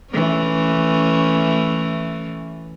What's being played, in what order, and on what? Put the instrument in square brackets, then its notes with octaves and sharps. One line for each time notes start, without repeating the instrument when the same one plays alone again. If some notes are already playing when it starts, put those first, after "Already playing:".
[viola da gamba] E3 A3 C#4